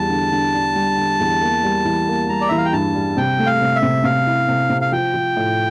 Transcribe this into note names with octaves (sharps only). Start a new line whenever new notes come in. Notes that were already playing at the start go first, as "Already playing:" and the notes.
Already playing: E2 G3 A5
D3
D3
D4
G3
D3
E2
A#3
G3
E3
A#3
G3 A#5
D5
E3 E5
F5
G5
G2 A5
G3
C3 G5
A3
F5
C3
E5
C3
C3 F5
E4
C3
C3
F5
F3 G5
F3
A2